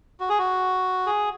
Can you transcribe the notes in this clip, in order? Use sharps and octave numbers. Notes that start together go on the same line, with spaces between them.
F#4
G#4
F#4
G#4